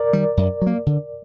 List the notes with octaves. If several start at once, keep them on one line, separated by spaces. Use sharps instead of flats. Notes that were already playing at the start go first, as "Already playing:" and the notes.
Already playing: A#4 D5
D#3 G3
F#2
F#3 A#3
D3